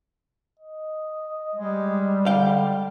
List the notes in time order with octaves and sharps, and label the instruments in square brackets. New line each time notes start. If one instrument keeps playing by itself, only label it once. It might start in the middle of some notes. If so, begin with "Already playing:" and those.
[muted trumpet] D#5
[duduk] G3 [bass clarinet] G#3
[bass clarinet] D3 [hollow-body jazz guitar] F5 G5